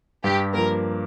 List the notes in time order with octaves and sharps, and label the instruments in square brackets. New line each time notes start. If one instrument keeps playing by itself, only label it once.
[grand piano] G2 [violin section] G4
[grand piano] F3 A#3 [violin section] A#4